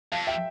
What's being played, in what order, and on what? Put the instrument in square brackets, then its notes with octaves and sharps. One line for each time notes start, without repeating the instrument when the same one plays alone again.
[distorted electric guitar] F2 [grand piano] F5 A5
[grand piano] E5 G5